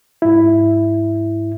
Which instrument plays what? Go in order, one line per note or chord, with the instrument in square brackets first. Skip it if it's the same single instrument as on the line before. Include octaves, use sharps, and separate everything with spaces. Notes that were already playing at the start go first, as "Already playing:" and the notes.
[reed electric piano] G#2 E4